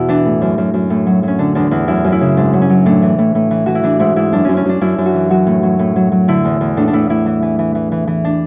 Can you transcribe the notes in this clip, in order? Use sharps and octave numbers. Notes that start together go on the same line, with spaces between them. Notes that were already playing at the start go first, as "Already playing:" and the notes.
Already playing: E2 B2 E4 F#4
E3 D4
A2
F#2
F#2
F#2
A2
F#3
F#3 C#4
D3 D4
E2 D4
E2 E4
F#2 E4
F#2
E4
C#3
G#2 D4
F#3
C#4
F#3
A2 D4
E3
A2
A2
E3
E3 F#4
E4
E3 D4
G#2 E4
G#2 E4
F#2 D4
F#2 C#4
C#4
F#2 D4
F#2 E4
F#2
F#4
E3
F#3 F#4
A2
F#3
A2
F#3
F#3
D3 E4
E2
E2
A2 D4
D4
A2 E4
A2 E4
E3
E3
E3
E3
E3
E3
D4